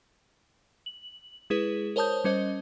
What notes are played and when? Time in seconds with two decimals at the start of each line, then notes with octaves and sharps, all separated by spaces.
0.86 F#7
1.50 G#3 E4 G#4 B4
1.96 A#4 C5 C#5 A5 D#6 G6
2.24 G3 C#4 C5 D#5